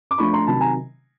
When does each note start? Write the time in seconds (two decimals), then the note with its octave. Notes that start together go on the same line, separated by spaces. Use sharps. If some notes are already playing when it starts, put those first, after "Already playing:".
0.11 D6
0.18 F3 A3 D4 F4 B5 C#6
0.33 A#5 C6
0.47 C3 D#3 F#3 A5 B5
0.60 G#5 A#5